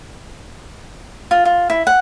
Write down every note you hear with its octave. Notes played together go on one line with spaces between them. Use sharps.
F4
F4
E4
F#5